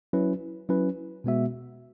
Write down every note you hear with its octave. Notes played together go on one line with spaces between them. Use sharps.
F#3 C#4 E4 B4
F#3 C#4 E4 B4
B2 G#3 B3 F#4 E5